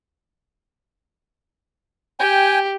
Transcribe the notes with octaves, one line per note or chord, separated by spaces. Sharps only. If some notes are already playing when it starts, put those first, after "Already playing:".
G4 G5 G#5